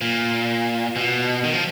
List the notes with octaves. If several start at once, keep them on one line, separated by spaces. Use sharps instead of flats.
A#2
B2
D#3
F3